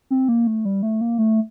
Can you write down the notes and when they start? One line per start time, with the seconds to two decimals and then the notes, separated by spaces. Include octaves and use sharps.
0.10 C4
0.29 A#3
0.47 A3
0.65 G3
0.83 A3
1.01 A#3
1.18 A3